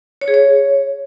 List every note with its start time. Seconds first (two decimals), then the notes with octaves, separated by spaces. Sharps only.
0.21 C#5
0.28 G#4
0.34 C#5